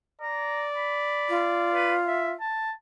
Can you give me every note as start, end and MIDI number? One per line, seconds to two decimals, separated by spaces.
0.22 2.12 74
0.22 0.65 82
0.76 1.43 83
1.29 2.32 65
1.74 1.94 71
2.07 2.32 76
2.40 2.71 81